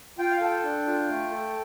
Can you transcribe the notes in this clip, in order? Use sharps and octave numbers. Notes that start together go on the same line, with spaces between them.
F4 G5
F5
A4 G5
D4
F4
A3
A4